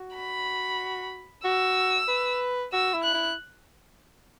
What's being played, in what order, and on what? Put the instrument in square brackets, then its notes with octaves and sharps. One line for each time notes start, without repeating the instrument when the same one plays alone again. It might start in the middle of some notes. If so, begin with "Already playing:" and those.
Already playing: [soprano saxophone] F#4
[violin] B5
[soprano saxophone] F#4 [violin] E6
[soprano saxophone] B4
[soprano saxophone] F#4 [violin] E6
[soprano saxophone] E4
[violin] F#6
[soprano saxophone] E4